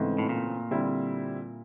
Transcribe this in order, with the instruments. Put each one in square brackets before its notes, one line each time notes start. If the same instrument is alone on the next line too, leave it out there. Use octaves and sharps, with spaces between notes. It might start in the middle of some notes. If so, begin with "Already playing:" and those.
Already playing: [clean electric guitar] G#2 [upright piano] C#3 E3 A3 C4
[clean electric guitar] A2
A#2
[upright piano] D3 G3 C4 E4